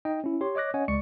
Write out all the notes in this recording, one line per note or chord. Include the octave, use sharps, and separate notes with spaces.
D#4 D#5 G5
C#4 E4
G4 C#5 C6
C#5 D#5 D6 F#6 A#6
C#4 C#5 D#5 F#5 G#5
C#2 G#3 D5 C#6 C#7